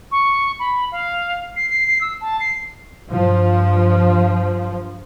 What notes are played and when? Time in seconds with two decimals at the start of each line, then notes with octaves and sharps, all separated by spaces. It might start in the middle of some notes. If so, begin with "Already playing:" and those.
0.12 C#6
0.59 B5
0.91 F5
1.56 C7
1.69 C7
1.87 C7
2.01 E6
2.21 A5
2.40 C7
3.10 G2 F3